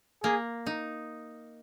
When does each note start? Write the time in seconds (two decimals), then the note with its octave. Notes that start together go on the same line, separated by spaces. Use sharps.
0.23 A#3 G#4
0.66 D#4